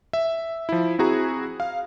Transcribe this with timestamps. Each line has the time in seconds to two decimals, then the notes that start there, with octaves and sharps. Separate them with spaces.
0.13 E5
0.69 F3 E4
0.99 C4 E4 F#4 G#4 A#5
1.60 F5